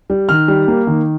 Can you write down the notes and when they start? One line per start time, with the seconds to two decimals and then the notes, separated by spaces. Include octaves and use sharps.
0.10 G3
0.29 D#3 F6
0.48 G3
0.68 A#3
0.87 D#3